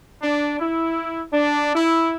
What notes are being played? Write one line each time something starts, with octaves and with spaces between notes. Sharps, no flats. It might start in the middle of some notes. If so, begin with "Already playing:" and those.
D4
E4
D4
E4